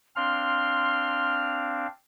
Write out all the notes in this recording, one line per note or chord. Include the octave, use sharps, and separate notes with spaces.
C4 D4 F5 C6 F6